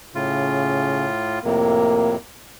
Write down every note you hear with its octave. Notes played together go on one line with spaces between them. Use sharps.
A2 C#3 F4
F2 A2 C3 A#3